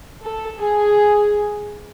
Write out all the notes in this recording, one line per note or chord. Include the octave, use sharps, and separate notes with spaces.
A4
G#4